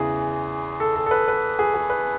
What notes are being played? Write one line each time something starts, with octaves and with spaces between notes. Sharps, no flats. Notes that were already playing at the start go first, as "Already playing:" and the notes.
Already playing: E2 C#3 E3 G#4
A4
A4
A4
B4
B4
G#4
G#4
B4